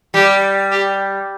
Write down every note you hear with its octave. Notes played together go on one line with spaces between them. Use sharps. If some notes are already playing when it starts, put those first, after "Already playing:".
G3 G4
G4